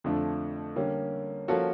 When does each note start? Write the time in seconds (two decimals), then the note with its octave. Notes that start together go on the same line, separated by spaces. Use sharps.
0.04 F2 D3 F3 A3 D4
0.76 D3 G3 A#3 C#4
1.48 F3 A#3 C#4 F#4 A4